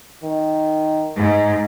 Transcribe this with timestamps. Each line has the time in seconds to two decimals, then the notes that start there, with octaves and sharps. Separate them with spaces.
0.24 D#3
1.17 G#2